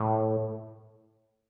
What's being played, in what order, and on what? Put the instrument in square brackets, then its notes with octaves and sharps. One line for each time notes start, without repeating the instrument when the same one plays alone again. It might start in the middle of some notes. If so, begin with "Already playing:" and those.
Already playing: [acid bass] A2